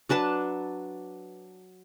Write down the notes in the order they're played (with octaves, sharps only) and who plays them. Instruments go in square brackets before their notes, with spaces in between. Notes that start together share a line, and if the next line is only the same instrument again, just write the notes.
[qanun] F#3 D4 B4 A5